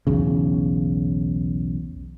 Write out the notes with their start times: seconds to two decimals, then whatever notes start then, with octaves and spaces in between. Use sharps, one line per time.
0.07 B1 E2 C#3